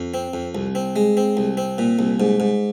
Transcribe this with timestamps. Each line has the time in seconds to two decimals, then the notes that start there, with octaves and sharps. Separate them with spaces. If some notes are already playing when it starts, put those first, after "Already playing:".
Already playing: F2
0.14 C4
0.34 F2
0.55 C2
0.75 C4
0.96 G#3
1.17 C4
1.37 C2
1.57 C4
1.78 A#2
1.99 C2
2.20 G#2
2.40 G#2